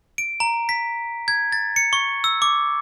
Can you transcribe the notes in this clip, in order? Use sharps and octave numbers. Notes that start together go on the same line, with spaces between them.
D7
A#5
B6
G#6
A6
C#7
C#6
E6
D6